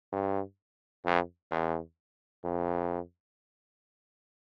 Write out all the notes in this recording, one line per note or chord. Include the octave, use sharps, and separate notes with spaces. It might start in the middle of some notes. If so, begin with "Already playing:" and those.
G2
F2
E2
F2